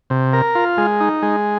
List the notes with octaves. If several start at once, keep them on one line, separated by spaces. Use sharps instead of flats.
C3
A#4
F4
G#3
D#4
G#3